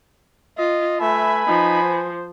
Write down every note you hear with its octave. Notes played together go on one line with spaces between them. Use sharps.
F4 D#5
A3 B4 E5 G#5 B5
F3 D#4
C5